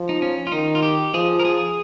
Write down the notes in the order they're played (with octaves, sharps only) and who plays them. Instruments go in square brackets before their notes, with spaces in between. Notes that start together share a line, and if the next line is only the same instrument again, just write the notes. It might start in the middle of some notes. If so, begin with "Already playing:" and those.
Already playing: [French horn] F3
[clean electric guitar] D#4
C#4
F4
[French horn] D#3 [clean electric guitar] D#4
[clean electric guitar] F4
G4
[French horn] F3 [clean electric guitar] G#4
[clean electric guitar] A#4
G#4